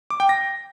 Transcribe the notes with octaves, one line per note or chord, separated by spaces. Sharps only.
D6
G5
A#6